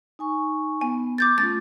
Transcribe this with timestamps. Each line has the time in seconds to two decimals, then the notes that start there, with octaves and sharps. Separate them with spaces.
0.19 D#4 G#5 C#6
0.81 B3 G#5
1.18 D6 G6 A6
1.38 A3 C#4 F4 A6